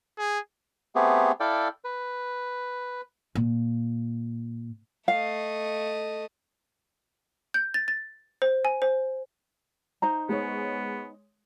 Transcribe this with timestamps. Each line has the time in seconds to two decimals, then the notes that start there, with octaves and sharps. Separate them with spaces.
0.19 G#4
0.95 A3 B3 C4 G4 G#4
1.40 E4 A4 D5 F5 G5
1.84 B4
3.35 A#2
5.08 A3 D#5 F5
7.54 G6
7.74 A6
7.88 A6
8.42 C5
8.65 G#5
8.82 C5
10.02 D#4 C5 A#5
10.29 G#3 B3 C#5